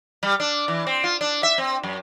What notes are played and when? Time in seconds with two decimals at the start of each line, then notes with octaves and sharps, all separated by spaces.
0.23 G3
0.40 D4
0.68 E3
0.87 C4
1.04 F4
1.21 D4
1.43 E5
1.58 C4
1.83 F#2